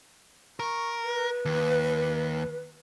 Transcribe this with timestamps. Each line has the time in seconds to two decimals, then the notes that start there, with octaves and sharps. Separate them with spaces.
0.60 A#4 C#6
1.04 B4
1.45 D#2